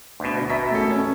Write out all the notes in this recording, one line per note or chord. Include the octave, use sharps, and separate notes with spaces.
D2 B2
B2 E5 A#5 B6
A3 C#4 A4
C#4